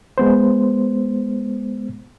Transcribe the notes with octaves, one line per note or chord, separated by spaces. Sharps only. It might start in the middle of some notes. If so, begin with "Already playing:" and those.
G#3 B3 C5